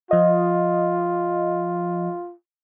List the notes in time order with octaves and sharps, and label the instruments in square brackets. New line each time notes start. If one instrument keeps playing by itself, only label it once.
[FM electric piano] F3 D#5 [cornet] F4